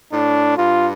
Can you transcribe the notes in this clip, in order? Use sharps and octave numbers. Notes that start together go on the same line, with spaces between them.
A2 D4
G2 F4